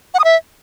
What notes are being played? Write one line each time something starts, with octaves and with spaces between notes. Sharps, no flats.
F#5
D#6
E5